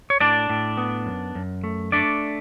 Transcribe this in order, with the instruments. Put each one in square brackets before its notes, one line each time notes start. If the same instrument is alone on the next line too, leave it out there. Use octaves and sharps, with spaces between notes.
[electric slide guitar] C#5
A2 D4 D5
A2
B3
F#2
F#2
A3
A3 D4 D5